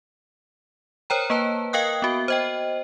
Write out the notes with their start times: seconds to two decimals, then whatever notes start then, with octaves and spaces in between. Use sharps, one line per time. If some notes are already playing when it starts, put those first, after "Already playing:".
1.10 A#4 C5 C#5 G5 A#5
1.30 A#3 B4 A5
1.73 A#4 D#5 F5 G5 D#6 F#6
2.02 B3 F#4
2.28 C5 D#5 G5